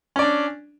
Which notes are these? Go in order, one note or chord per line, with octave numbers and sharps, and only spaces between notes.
C#4 D4 D5